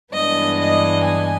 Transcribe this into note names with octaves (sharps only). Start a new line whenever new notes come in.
G2 E3 G#3 B3 D4 D#5
D#5
G#5